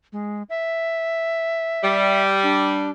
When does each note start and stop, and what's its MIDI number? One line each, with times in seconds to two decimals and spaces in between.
0.12 0.43 56
0.50 2.22 76
1.84 2.88 55
2.43 2.90 62